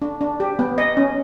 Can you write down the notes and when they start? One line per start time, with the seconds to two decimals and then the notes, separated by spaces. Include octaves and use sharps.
0.02 D4
0.21 D4
0.40 G4
0.59 B3
0.78 D#5
0.97 C#4